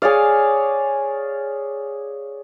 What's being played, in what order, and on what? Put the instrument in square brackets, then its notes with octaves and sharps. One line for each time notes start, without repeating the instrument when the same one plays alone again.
[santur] G#4 C#5 D5 F5